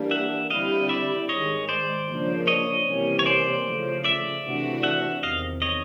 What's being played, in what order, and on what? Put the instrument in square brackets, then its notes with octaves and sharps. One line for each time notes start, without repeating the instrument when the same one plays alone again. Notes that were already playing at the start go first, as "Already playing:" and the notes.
Already playing: [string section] E3 G3 A#3 D4
[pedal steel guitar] E5 F#5
[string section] D3 G3 C4 E4 [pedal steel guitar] D#5 F5
[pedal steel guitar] D5 E5
[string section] G#2 D#3 G#3 [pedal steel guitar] C#5 D#5
[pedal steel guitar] C5 D5
[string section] C#3 F3 A#3 D4
[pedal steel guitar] C#5 D#5
[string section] C3 E3 G3 A#3 C#4
[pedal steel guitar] C#5
C5 D5
[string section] C#3 F3 A3
[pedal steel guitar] D5 E5
[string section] C3 E3 A3 D4 F#4
[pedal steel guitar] E5 F#5
[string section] E2 C3 D#3 [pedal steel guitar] D#5 F5
[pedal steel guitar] C#5 D#5